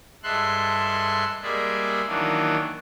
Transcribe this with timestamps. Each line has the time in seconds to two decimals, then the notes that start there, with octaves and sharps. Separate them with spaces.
0.23 G2 G#3 A4 E5 C6 F#6
1.42 G3 G#3 A#3 G#4 D5 E5
2.07 D#3 E3 F#3 A#3 D4